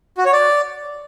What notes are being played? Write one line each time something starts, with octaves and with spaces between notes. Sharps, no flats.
F#4
C#5
D5